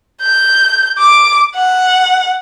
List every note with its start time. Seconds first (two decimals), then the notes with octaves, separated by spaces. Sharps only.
0.22 G6
0.99 D6
1.56 F#5